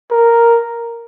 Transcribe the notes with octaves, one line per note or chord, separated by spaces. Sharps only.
A#4